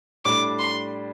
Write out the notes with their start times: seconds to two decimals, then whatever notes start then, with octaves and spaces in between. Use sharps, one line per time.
0.25 A2 G3 D4 D6
0.59 C6